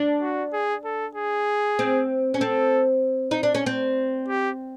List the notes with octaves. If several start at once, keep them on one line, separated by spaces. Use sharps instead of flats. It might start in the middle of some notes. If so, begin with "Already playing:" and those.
Already playing: D4
F#4
G#4
A4
G#4
C4
C#4
C4 A4
D#4
D4
C#4
C4
G4